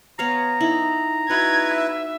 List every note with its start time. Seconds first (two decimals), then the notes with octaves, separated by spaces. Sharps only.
0.19 B3 C#5 F5 A#5
0.61 D#4 E4
1.30 D#4 E4 F#4 B4 G#6
1.74 E5